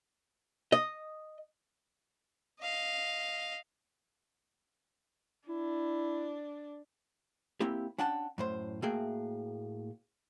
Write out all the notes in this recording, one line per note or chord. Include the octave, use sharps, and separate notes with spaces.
D#5
D#5 F5
D4 E4
A#3 C4 E4 G4
C#4 D4 F#5 G5 A5
F#2 A2 C5
A2 A3 A#3 F#4 G#4 G5